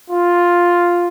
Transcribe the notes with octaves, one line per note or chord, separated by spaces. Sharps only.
F4